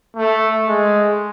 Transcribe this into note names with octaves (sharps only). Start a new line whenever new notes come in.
A3
G#3